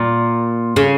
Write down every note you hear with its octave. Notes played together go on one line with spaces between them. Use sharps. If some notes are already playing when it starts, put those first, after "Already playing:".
Already playing: A#2
C#3